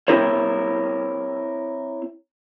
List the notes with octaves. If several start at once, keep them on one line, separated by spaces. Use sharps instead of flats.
C4 E4 A#4 C5 C#5